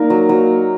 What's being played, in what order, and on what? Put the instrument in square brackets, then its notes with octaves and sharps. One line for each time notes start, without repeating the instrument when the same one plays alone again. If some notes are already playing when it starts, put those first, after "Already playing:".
Already playing: [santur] A#3 D#4 A#4 D5
F#3
F#3